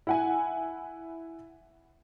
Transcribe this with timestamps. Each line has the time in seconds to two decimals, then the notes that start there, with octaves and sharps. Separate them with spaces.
0.07 E4 F#5 G#5